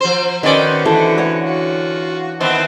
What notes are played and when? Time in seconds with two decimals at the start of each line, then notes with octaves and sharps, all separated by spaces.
0.01 F3 C5
0.43 D#3 C4 C#4 F#4 B4 C5 D5
0.86 D3 E3 A4
1.18 C#5 F#5
1.44 F4 F#4
2.40 D#3 B3 C4 D#5 E5 A5